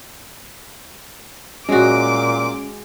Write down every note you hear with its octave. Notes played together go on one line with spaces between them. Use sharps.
A#2 G#3 C#4 F#4 D6